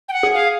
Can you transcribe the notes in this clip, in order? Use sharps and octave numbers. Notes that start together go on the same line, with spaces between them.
G5
F#5
G#4
F5